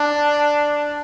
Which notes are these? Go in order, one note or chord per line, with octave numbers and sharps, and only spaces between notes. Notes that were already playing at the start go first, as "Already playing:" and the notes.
Already playing: D4